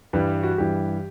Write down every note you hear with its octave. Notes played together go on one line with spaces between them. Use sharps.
G2 E3 G3 B4
F#4
G2 E3 G3 G4